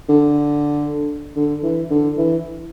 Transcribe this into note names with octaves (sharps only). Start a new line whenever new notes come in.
D3
D3
E3
D3
E3